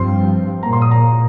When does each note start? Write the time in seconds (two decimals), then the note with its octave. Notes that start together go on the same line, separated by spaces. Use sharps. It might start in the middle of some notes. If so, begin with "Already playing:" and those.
Already playing: G2 F3 C4 C6
0.63 A#2 A#3 A#5
0.73 C6
0.82 D#6
0.91 A#5